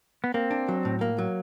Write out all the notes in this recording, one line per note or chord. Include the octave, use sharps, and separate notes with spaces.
B3
A#3 C4
D4
F#3
A2
A#3
F#3